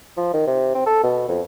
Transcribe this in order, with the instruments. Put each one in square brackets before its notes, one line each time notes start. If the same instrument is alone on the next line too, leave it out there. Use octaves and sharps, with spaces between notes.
[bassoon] F3
D#3
C3
C4
A4
B2
F2